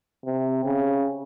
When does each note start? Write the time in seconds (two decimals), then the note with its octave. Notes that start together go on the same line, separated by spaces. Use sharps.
0.25 C3
0.64 C#3